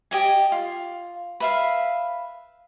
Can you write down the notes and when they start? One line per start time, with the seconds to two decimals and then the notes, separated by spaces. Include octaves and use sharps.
0.11 G4 D#5 G#5
0.52 F4
1.40 B4 E5 F5